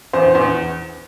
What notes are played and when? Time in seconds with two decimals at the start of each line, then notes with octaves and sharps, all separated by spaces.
0.13 E2 C5
0.35 E2